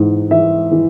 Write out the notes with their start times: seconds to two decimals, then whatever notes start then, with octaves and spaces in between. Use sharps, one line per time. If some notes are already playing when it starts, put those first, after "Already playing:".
Already playing: G#2 E3
0.31 E3 E5
0.71 E3